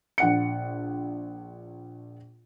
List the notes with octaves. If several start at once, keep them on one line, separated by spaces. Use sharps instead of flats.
A#1 F#5 C#7